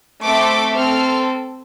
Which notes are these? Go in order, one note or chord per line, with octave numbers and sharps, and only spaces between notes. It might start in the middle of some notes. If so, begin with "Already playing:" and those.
A3 C4 A4 D6
C4 A4 F6